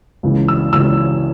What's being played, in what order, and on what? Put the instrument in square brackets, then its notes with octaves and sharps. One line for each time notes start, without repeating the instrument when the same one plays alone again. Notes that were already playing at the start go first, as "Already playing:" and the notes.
[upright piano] C#2 C#3 E3
E6
C#2 C#3 E3 E6